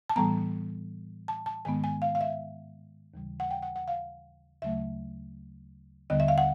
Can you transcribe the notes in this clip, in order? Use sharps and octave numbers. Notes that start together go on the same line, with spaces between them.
A5
A2 E3 G3 B3 A#5
A5
A5
G#2 D#3 G#3 B3 G#5
G#5
F5
F5
E5
D#2 C#3 E3 G3
F#5
G5
F#5
F#5
F5
D2 C#3 F#3 A3 E5
D#2 D3 G3 B3 D#5
E5
F5
F#5